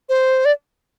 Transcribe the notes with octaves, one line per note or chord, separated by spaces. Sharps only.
C5
D5